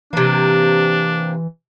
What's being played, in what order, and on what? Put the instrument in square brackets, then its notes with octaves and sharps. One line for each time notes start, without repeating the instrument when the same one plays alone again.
[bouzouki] C3 A#3 [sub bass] E3 [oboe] D4